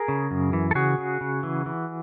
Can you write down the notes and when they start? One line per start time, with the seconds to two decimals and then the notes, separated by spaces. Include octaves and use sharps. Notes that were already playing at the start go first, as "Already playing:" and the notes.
Already playing: G#4 A#4
0.08 C#3
0.31 F#2
0.53 E3
0.71 A4
0.75 C#3 F#4 G#4
0.98 C#3
1.21 C#3
1.43 E3
1.66 E3